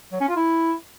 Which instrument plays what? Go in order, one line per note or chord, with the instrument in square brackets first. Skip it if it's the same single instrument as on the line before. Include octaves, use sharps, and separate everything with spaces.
[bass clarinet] F#3
C#4
F4
E4